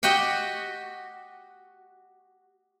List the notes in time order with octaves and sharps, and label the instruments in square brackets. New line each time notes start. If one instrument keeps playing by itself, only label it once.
[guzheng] F#4 G4 D#5 F#5 G5